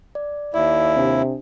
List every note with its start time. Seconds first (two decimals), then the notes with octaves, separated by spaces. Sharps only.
0.15 D5
0.54 D#2 E4 D5 E5
0.97 C3 D4